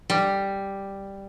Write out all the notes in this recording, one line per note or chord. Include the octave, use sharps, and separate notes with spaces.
G3